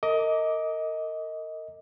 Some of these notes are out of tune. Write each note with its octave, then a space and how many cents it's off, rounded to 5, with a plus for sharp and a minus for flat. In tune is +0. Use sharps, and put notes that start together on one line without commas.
A#4 -35 D#5 +20 D6 -5